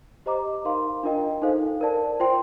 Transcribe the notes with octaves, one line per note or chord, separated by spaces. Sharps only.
G4 C5 D#5 A#5 D6
D#4 A#4 F5 C6
D4 F4 A#4 D#5 G5
D#4 A4 C5 F5
A#4 D5 A5
F4 C5 G5 C6